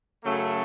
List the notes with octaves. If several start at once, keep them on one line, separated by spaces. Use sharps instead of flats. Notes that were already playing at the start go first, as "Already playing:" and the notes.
F#2 C#3 F#3 A3